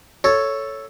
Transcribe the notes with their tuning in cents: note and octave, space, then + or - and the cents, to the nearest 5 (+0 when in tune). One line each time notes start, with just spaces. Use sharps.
A4 +0 C#5 +0